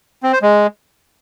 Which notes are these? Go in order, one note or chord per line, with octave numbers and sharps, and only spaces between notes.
C4
C5
G#3